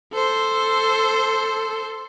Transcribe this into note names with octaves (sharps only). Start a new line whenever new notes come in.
A4 C5